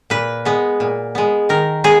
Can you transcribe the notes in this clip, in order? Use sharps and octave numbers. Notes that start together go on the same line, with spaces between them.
A#2 B4
G#3 B3
A#2
G#3 B3
D#3 A#4
G#3 B3 G#4